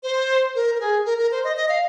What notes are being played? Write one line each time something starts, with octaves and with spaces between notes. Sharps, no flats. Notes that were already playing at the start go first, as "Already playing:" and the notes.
C5
A#4
A#4
G#4
A#4
A#4
C5
D#5
D#5
F5